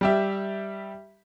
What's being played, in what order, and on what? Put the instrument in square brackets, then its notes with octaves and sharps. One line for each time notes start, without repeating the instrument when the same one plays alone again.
[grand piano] G3 G4 E5